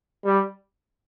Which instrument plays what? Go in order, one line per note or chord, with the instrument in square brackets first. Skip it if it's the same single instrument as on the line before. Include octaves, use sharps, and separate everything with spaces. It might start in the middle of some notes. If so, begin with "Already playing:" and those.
[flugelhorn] G3